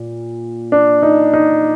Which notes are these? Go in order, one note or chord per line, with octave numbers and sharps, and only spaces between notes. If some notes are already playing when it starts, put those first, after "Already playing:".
Already playing: A#2
D4
D#4
D#4